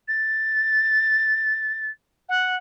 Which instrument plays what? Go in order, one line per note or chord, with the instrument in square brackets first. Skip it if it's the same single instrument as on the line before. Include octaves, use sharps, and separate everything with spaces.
[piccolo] A6
F#5